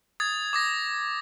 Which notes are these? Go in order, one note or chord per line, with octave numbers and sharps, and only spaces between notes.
D#6 G#6 A6
D6 D#6 A#6